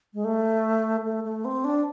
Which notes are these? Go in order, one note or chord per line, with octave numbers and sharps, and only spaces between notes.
G#3
A3
A3
A3
C4
D4